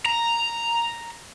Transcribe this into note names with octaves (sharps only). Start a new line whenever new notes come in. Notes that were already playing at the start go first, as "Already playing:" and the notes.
A#5